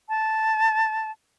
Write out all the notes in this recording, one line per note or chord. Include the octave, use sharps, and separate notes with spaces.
A5